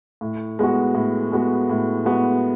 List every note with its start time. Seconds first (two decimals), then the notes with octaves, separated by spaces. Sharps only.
0.21 A2
0.59 G#3 B3 F#4
0.95 A2
1.32 G#3 B3 F#4
1.70 A2
2.05 G#3 B3 F#4